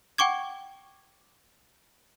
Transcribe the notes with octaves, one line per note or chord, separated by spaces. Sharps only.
F#5 G5 C#6 D6 G#6